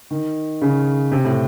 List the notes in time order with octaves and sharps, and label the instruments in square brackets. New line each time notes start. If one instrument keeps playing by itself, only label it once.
[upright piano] D#3
C#3
C3
A2